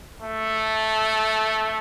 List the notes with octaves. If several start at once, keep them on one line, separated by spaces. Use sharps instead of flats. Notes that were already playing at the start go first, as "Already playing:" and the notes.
A3